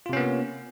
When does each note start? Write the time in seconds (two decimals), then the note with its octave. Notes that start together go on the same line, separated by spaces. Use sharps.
0.06 F4
0.09 C3
0.13 C#4
0.17 B3
0.20 A#3